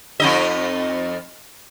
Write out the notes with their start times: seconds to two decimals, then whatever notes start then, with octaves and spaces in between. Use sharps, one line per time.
0.20 F2 D#4 D#5